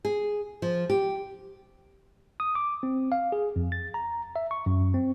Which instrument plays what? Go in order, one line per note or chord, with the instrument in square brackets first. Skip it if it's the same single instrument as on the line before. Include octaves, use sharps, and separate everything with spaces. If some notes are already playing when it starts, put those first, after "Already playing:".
[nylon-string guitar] G#4
F3
G4
[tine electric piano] D#6
D6
C4
F5
G#4
F2
A6
A#5
E5
C#6
F#2
C4